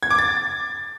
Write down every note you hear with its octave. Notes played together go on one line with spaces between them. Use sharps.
G#6
D6
A6